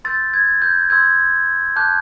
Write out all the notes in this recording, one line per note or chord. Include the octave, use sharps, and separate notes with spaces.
C6 E6 G6 A6
G#6
G6
C6 E6 G6 G#6
A5 D6 F#6 G6